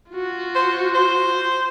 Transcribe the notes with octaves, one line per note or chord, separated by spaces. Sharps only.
F4 F#4
C5
C5